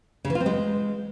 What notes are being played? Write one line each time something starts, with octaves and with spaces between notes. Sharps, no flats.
C#3
E3
F4
C4
G#3